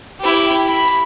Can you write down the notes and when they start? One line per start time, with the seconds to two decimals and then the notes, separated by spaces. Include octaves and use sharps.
0.21 E4 G4
0.68 B5